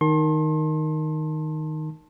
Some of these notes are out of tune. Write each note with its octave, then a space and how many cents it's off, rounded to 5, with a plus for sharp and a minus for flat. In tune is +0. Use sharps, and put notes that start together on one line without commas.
D#3 +0 A5 +0 C6 +35